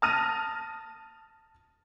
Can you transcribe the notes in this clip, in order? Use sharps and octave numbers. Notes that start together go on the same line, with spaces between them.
A5 D#6 F6 A#6 D#7